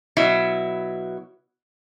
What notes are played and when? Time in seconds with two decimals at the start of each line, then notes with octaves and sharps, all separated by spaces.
0.17 B2 F#3 E4